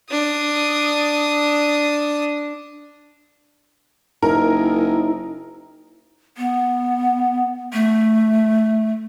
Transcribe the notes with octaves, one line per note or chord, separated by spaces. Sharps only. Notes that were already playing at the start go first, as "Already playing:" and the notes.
D4 D#6
F#1 D#4 E4 A#4
B3
A3